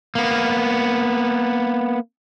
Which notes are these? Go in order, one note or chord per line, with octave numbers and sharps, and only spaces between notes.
A#3 B3